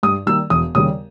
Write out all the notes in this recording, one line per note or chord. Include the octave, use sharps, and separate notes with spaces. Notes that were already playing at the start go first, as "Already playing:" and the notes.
G2 D#6
D#3 G3 A#3 E6
E1 D#6
D#2 C#3 G3 D#6